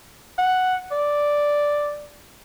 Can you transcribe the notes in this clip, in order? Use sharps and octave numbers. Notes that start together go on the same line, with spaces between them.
F#5
D5